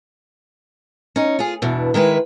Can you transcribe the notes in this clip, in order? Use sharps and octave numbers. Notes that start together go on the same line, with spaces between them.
C#4 D#4
F4 G#4
E2 G2 B2 D4
D#3 G#3 E4 B4